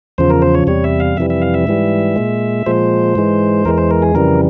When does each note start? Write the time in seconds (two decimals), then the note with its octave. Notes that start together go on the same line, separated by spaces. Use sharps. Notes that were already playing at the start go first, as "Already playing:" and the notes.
0.18 E2 C#3 F3 C5
0.30 A#4
0.42 C5
0.55 C#5
0.67 E2 C3 G3 C#5
0.84 E5
1.00 F5
1.17 F2 C3 E3 G3 E5
1.30 E5
1.42 F5
1.54 E5
1.67 G#2 E3 G3
2.16 A#2 G#3
2.66 A#2 F3 G#3 C5
3.15 G#2 E3 G#3
3.65 E2 E3 G#3 A#4
3.78 C5
3.91 A#4
4.02 G#4
4.15 F2 C#3 E3 G3 A#4